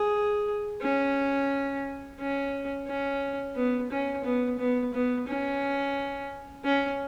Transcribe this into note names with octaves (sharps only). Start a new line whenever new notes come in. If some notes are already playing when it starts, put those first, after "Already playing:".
Already playing: G#4
C#4
C#4
C#4
B3
C#4
B3
B3
B3
C#4
C#4